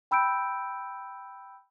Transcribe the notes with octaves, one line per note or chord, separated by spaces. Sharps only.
G5 B5 E6 G6 D7